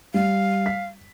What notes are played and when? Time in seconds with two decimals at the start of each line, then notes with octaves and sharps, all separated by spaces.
0.14 G3 F5
0.66 B6